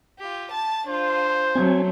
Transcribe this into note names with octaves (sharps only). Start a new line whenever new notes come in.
F4 G4
A5 A6
D4 F4 C5
F#3 A3 C4 G#5